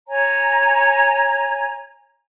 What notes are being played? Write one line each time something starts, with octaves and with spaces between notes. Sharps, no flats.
C#5 G#5 A#5